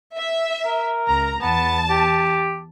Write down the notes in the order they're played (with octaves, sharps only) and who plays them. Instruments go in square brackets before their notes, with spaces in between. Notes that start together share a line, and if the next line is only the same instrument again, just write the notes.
[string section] E5
[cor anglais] A#4
[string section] C#2 A#5
[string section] E2 A5 [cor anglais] B3
[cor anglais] G4